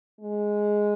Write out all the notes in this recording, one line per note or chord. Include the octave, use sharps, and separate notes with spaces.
G#3